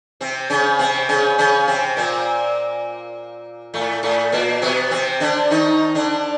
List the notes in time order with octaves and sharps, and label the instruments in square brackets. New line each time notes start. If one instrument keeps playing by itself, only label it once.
[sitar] C3 C4
C#3 C#4
C3 C4
C#3 C#4
C#3 C#4
C3 C4
A#2 A#3
A2 A3
A2 A3
A#2 A#3
B2 B3
C3 C4
D3 D4
D#3 D#4
D3 D4